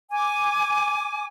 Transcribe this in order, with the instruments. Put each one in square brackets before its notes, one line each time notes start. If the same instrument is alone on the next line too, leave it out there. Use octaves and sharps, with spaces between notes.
[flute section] G#5 D6